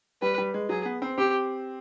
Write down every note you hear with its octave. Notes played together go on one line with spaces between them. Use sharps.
G3 B4
G3
G#3
F#3 G#4
B3
C4
C4 G4